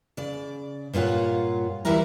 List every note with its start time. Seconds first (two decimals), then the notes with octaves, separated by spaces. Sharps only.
0.17 C#3 D5
0.93 G2 A#2 F4 C#5 F#5
1.85 D2 E3 G3 E4 A#4 A#5